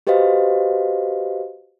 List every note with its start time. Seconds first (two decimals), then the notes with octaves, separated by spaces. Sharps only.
0.07 F#4 G4 B4 C5 D#5 F5